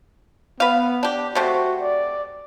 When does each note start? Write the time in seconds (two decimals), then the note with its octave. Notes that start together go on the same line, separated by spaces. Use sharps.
0.60 B3 B4 F5
1.03 D4 G4
1.35 C3 A3 C4 F#4
1.81 D5